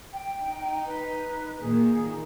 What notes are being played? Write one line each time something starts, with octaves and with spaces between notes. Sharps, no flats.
G5
D#4
B4
A#2 D#3 A#3 G#4